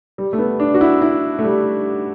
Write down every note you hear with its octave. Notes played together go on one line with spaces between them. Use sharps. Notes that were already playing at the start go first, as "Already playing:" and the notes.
G3
A3
B3
D4
F#4
E4
E4
A3
G3